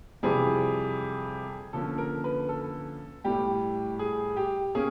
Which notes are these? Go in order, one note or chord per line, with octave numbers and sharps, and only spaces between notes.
F2 C3 E3 G3 G#4
D3 F3 A#3 C#4 A4
A#4
B4
A4
A2 E3 G3 G4
G#4
G4
A#3 C#4 G#4